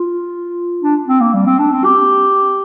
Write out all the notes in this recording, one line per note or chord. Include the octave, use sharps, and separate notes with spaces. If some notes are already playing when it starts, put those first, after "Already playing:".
Already playing: F4
D4
C4
A#3
G3
C4
D4
C4
G4